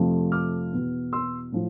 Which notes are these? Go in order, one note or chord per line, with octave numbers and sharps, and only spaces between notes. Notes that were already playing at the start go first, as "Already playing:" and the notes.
Already playing: F2 C3 F3 A3
D6 F6
E2 B2 B3
C6 E6
A2 F3